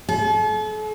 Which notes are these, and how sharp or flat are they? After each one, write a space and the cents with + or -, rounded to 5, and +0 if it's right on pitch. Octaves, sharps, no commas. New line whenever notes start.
A4 -45